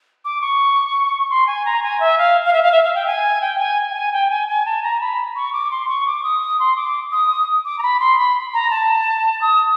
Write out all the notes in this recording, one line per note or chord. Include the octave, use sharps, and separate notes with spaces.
D6
C#6
C6
G#5
A#5
G#5
E5
F5
F5
E5
F5
E5
F5
G5
G#5
G5
G#5
G5
G#5
G5
G#5
G#5
A5
A#5
B5
C#6
D6
C6
C#6
D6
D#6
C6
D6
D#6
D6
A#5
B5
C6
B5
A#5
A5
D#6